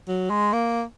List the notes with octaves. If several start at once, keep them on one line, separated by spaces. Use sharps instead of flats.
F#3
G#3
A#3